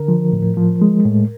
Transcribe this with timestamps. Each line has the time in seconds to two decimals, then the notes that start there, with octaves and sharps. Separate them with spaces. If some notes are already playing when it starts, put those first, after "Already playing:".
Already playing: D3 A#4
0.08 F3
0.32 A2
0.57 F3
0.82 G#3
1.05 A2